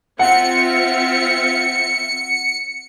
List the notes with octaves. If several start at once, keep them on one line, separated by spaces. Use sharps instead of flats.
C4 F4 E5 F#5 C#7